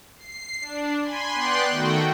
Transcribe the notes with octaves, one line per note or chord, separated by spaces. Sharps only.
C7
D4
G#5 B5 C6
B3 D5 G5 C6 F#6
D#3 A3 F#4 F#5 G5